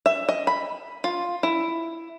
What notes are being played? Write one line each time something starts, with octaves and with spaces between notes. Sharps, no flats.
E5
D#5
B5
F4
E4